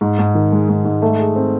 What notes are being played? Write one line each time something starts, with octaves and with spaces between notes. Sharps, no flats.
G#2
G#2
D#3
G#3
G#2
G#2
A3
G#4
C4